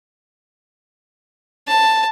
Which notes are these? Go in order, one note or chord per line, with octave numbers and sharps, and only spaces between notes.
A5